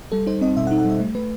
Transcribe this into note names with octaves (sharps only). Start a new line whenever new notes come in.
G3 A4
D#4 C5
C4 D#5
B2 E5
F#5
D#4
F#5
G3 E5
A3
A3 B4